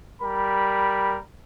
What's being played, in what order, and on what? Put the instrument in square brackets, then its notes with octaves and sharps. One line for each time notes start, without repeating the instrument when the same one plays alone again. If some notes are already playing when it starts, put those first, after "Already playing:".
[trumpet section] G3 A#4 B5